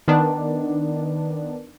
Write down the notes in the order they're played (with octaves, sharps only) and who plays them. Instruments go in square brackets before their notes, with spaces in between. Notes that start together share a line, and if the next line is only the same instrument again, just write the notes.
[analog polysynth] D#3 B3 D4